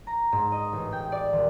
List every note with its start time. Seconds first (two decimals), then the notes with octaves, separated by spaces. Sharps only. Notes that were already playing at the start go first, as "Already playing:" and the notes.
0.07 A#5
0.32 G#2
0.52 D#5
0.73 A1
0.92 G5
1.12 D5
1.33 D#1